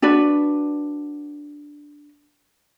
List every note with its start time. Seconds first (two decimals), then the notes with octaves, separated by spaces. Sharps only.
0.02 D4 F#4 B4 D5